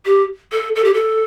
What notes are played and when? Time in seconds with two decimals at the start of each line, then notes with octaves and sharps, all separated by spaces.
0.06 G4
0.52 A4
0.76 A4
0.84 G4
0.94 A4